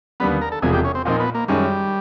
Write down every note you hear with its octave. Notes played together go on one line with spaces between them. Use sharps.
D#2 D3 G3 B3 B4
A#4
A4
E1 E2 C3 F3 G#3 G#4
G4
C#4
C4
A#2 F3 A#3 C4 D#4
B3
A#3
F#2 D#3 G3 G#3 C#4